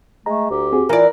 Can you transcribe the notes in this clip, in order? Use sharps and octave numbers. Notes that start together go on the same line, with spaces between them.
G#3 A3 A#5
D2 G4
C4 F#4 G#4
E3 F4 A#4 D5 G#5